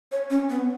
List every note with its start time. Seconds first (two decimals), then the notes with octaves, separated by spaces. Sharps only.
0.12 C#5
0.30 C#4
0.50 B3